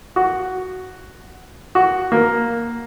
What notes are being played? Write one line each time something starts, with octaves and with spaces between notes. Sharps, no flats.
F#4
F#4
A#3